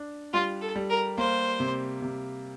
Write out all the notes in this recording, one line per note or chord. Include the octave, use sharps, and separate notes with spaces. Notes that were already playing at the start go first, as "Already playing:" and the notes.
Already playing: D4
G3 F4
A4
G3
A#4
A#3 C5
C3
C3